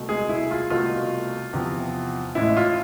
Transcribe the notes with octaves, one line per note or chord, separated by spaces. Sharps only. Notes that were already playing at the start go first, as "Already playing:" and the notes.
Already playing: C2 B2 A3
G#3 G#4
E4
F4
C2 B2 A3 F4
E2 C3 F3
A1 A2 G#3 E4
F4